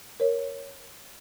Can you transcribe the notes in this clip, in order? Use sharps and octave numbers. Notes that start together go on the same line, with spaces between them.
A#4 C#5